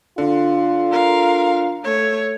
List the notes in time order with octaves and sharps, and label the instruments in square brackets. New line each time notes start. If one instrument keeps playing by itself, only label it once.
[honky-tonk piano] D3 [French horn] F4
[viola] A#4 F5
A3 C#5